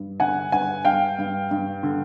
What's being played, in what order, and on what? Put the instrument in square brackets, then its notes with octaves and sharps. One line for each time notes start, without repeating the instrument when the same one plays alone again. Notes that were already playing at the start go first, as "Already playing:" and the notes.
Already playing: [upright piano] G2
D3 F#5 G#5
G2 F#5 G#5
G2 F5 G5
G2
G2
D3